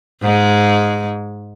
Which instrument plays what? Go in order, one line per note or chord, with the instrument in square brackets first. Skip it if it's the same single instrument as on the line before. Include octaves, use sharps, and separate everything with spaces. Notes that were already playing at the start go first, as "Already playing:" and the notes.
[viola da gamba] G#2 G#3